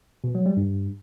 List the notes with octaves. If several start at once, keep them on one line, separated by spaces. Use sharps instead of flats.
B2
F#3
G3
G2